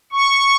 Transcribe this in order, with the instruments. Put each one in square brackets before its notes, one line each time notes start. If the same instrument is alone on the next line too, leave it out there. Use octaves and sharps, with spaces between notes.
[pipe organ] C#6